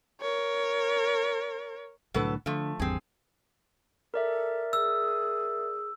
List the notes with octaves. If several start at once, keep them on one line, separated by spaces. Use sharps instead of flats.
A#4 C#5
C2 A2 D3 F#3 A4 B4
D3 F3 A3
G#1 E2 G3 C4 G#4
A4 A#4 D5 E5
G#4 E6